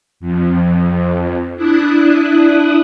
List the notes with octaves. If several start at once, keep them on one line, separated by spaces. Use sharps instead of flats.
F2
D4 E4 D#6 F#6